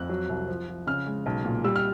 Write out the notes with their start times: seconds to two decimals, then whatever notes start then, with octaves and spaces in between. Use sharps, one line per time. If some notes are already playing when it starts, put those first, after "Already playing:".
Already playing: F2 F#6
0.09 F#3
0.29 C2
0.48 F3
0.68 F3
0.87 C#3 F6
1.07 G#3
1.26 B1
1.45 A#2
1.64 G3 E6
1.76 F6